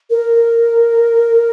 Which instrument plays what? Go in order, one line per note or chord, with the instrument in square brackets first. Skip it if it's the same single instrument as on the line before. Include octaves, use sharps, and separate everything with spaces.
[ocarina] A#4